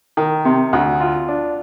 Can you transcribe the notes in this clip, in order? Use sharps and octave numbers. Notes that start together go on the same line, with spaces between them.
D#3
C3
D2
F4
D4